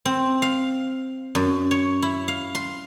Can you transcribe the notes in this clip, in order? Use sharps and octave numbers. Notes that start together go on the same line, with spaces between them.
C4
F5
F#2
C#5
E4
F5
C6